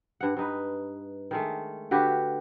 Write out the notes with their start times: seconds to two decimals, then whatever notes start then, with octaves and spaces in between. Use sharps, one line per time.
0.21 G2 F#5
0.37 G2 D#4 B4
1.31 D#3 G#3 A3
1.91 D3 F#4 G4 B4